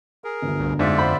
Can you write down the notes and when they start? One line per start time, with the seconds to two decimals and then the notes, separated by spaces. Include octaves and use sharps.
0.24 G#4 A#4
0.42 G1 D2
0.60 C2
0.79 F2 G#2 F4 D5 E5
0.98 C5 F#5 B5